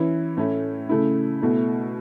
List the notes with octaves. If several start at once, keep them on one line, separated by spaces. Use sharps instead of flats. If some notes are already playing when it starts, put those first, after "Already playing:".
Already playing: E3 C#4 E4
A2 A3 C#4 E4
C#3 A3 E4
B2 A3 E4